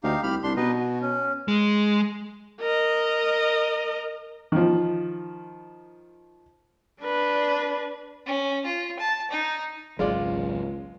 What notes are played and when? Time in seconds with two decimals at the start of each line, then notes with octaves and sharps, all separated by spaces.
0.04 D2 D#4 G4 F5
0.23 C2 G4 B5 F6
0.43 C2 D4 C6
0.57 B2 D#4 B4 D#5
0.79 F#4
1.02 C#4
1.48 G#3
2.61 A#4 D#5
4.52 D#3 F3
7.02 D4 B4
8.26 C#4
8.66 F4
8.99 A5
9.31 D#4
9.99 G#1 C#2 F#3 G#3 F4 D5